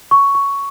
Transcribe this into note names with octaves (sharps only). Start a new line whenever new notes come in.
C#6
C#6